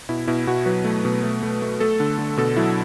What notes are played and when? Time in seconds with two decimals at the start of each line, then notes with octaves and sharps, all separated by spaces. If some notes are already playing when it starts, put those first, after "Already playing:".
0.09 B2 E4
0.27 B2 E4
0.47 B2 F#4
0.66 F#3 B4
0.85 A3
1.05 B2
1.23 A3
1.43 A3
1.62 A3
1.80 A3 A4
2.00 D3
2.19 D3
2.37 B2 A4
2.56 F#3 E4